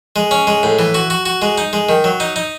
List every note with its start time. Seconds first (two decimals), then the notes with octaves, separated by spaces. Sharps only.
0.16 G#3
0.31 C#4
0.47 G#3
0.63 A2
0.79 E3
0.95 F#4
1.10 F#4
1.26 F#4
1.42 G#3
1.58 D#4
1.73 G#3
1.89 D#3
2.04 F#3
2.20 D#4
2.36 D#4